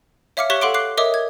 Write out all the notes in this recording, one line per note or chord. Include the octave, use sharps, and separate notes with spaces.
C#5 E5 F5 D6 F6 C#7
G4 C#5 C#6 F#6 B6 G7
A4 F5 F#5 C6 D6 D7
D6 F#6 C7
A#4 C#5 D#5 E5 D6 D#6
G#6